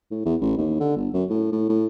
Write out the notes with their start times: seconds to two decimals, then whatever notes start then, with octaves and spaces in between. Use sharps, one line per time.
0.11 A2
0.25 E2
0.41 A1
0.58 D#2
0.80 D3
0.96 G1
1.13 F#2
1.30 A2
1.52 A2
1.69 A2